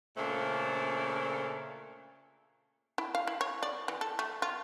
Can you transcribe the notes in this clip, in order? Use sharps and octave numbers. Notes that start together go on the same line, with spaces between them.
A#2 C#3 A3 D4 A#4 C5
E4
F5
E4
C#5
D5
E3
A4
A3
F4